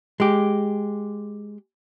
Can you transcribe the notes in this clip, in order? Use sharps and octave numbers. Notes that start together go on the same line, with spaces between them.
G#3 G4